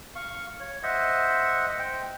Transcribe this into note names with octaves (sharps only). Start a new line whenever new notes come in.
F5 C#6
C#5
C5 D#5 E5 F#5
C5 G5